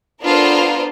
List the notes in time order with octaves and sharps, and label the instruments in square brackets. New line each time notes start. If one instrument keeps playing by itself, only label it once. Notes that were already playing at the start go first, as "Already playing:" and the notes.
[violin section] B3 D4 F4 A4 A#4 C5